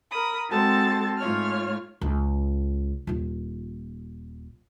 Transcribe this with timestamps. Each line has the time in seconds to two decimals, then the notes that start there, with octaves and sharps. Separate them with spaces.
0.11 A#4 B5 D#6
0.48 G#3 C4 F#4 A4 A5 A6
1.18 G#2 A3 F4 C#5 F6
2.01 C#2
3.07 D#1 F4